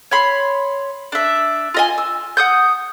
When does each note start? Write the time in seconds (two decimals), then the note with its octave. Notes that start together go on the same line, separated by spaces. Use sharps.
0.11 C#5 B5 C6
1.12 D4 E5
1.74 F4 D#5 G#5
1.98 E6
2.37 F#5 D#6 G6